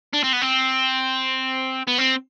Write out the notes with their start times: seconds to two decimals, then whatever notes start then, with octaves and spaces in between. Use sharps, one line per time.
0.13 D4
0.24 C4
0.33 B3
0.42 C4
1.87 B3
1.98 C4